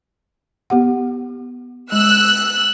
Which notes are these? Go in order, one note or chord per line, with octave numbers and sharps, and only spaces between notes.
B3 G4 F#5
G#3 E6 F#6